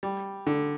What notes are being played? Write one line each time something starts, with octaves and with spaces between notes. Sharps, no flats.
G3
D3